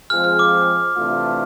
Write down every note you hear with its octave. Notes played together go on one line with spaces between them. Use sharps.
F3 G#3 C4 F4 G#4 F6
F6
D6
C3 E3 A3 D4 F4